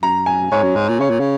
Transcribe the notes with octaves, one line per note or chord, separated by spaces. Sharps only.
F#2 A#5
G#5
G#2 C#5
F#2
G#2
A#2
C#3 C#5
A#2
C#3